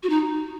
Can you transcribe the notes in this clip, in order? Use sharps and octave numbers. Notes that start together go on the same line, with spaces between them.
F#4
D#4